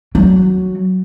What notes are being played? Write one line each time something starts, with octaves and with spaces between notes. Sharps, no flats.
F#3